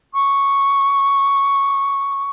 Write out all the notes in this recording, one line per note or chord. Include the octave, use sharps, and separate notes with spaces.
C#6 D6